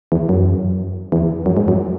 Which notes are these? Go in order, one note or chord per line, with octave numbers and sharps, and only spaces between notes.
E2
F#2
E2
F#2
G#2
F#2